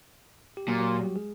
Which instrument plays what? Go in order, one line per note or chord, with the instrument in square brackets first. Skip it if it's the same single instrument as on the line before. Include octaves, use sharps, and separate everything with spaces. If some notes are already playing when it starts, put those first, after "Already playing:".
[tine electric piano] G4
[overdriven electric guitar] A#2 [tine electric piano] F#3 F#4
[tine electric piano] F#3 F#4
F#3 F#4
G3 G4
G#3 G#4